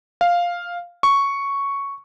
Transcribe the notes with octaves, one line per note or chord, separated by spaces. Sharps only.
F5
C#6